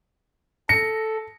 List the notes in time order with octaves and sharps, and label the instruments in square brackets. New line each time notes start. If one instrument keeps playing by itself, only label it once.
[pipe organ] A4 [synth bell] A#6 [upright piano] C#7